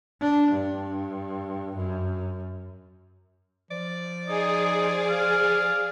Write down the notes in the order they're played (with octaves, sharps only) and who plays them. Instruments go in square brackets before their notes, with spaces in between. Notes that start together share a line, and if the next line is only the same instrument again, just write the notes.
[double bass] D4
G2
F#2
[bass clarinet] F3 [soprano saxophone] D5
[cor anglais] D#4 [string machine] G#4
[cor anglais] F5